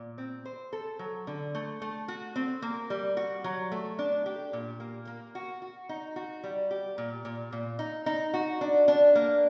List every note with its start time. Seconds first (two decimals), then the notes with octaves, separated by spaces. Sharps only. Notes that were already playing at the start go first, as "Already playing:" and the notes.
Already playing: A#2
0.18 C4
0.45 C5
0.73 A4
0.99 F#3
1.27 D3
1.55 A3
1.82 A3
2.08 F#4
2.36 C4
2.62 A#3
2.90 G3
3.17 F#4
3.44 F#3
3.72 A3
3.99 D4
4.26 G4
4.53 A#2
4.80 A#3
5.07 A#3
5.35 F#4
5.62 F#4
5.89 D#4
6.16 F#4
6.44 G3
6.71 G4
6.98 A#2
7.25 A#2
7.52 A#2
7.79 D#4
8.06 D#4
8.34 F#4
8.61 D4
8.88 D4
9.15 A#3